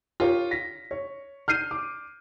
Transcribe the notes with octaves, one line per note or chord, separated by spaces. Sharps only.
F4 G4 A#4 C#5
A#6 B6
C#5
F6 G6 C7 D#7
D6